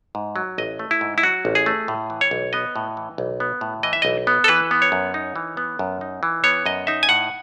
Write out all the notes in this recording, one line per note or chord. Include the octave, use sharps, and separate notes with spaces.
G#2
F#3
A1 D#5
A3
E4
G#2
E4
F#3 F#4
A1
G#4
A3
A2
E3
C#5
B1
B3 D#5
A2
E3
B1
B3
A2
E3 D#5
E5
B1 D#5
B3
A4
E3 B4
B3
C#5
F#2
D#4
E3
B3
F#2
D#4
E3
B3 C#5
F#2 D#5
D#4 E5
G#5
A2 F#5